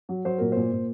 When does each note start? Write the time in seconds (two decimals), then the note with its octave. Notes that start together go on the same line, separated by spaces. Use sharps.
0.09 F#3
0.25 F#3 C5
0.38 A#2 A#4
0.52 A#2 C5
0.72 A#2